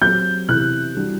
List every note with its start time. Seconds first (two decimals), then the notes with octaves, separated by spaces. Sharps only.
0.01 F#3 C4 G4 G6
0.49 C3 E3 B3 E4 G4 F#6
0.95 E3 G3 D4 F#4